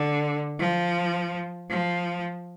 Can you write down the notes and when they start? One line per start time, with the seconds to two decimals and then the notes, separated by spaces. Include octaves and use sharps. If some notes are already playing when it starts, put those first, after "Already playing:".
Already playing: D3
0.59 F3
1.70 F3